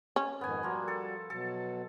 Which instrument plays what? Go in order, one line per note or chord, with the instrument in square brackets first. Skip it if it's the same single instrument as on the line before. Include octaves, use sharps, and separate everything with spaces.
[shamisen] C#4
[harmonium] F2 G#2 D#3 [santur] B3 G#5
[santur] F3 A#3 [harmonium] G3 F#4
[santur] A4
[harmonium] B2 F#3 [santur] A4